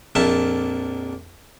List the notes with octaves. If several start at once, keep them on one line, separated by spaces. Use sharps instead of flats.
A#1 F2 A#3 E5 A5